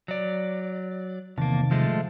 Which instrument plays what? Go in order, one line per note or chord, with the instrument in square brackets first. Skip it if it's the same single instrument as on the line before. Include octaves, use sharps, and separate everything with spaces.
[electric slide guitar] F#3 D5
[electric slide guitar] E2 A#3 [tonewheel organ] C3 D#3 A5
[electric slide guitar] F3 G#3 A3